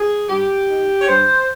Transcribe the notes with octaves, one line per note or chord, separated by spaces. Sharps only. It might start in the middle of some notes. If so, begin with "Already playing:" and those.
Already playing: G#4
G2 G4
D#3
C#5
G2 C5